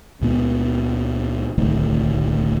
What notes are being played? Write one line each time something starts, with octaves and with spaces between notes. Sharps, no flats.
C#2 A#2 B3
D1 C2 D#3 A3